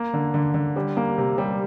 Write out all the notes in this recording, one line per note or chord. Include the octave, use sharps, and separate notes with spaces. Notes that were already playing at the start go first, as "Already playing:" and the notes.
Already playing: A#3
D3
D3
D3
G3
A#3
C3
G3